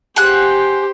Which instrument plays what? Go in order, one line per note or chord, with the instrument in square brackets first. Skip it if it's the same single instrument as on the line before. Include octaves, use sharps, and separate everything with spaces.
[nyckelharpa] G4 C5 [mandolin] G#4 F#5 F#6